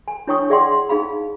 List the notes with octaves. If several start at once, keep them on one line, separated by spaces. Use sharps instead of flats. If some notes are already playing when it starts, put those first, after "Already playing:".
G#5
D4 E4 C#5 G5 C#6 D#6
G#4 D5 E5 F#5 G5 C6
D#4 G#4 F5 B5